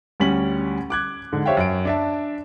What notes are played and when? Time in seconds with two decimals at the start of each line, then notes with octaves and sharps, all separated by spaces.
0.20 D2 G3 C#4 B6 F#7
0.90 D6 F#6 G#6
1.32 G#2 D3
1.46 G4 C5 C#5 E5 F5 G5
1.57 F#2 D7
1.85 D4 E5 A5